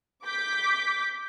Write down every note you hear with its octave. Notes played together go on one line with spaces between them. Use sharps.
D6 G6 B6